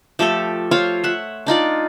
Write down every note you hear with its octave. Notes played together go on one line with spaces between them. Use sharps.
F3 A3 G4 A4
F4 C5 C#5 F5
E5 F#5
D4 D#4 F4 D5